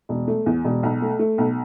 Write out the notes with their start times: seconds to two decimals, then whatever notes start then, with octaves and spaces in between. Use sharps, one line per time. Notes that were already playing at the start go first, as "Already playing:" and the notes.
0.09 E1
0.28 A3
0.46 E2
0.64 E1
0.83 B1
1.02 A3
1.19 A3
1.38 B1